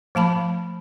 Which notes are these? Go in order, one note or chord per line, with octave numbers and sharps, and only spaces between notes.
F3 A3 A5 B5